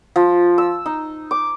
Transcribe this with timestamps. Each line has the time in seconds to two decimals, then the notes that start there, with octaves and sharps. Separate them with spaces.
0.16 F3
0.58 E6
0.86 D#4
1.31 D6